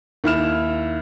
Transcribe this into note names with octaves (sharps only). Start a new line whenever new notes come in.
D#2 E4 F6 E7